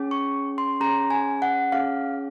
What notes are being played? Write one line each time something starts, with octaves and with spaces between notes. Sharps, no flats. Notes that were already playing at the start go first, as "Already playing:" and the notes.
Already playing: C#4 G#4
C#6
C6
C#4 G#4 A#5
G#5
F#5
C#4 G#4 F5